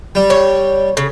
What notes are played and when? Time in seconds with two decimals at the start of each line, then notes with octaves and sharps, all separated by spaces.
0.15 G3
0.30 C#5
0.97 C#3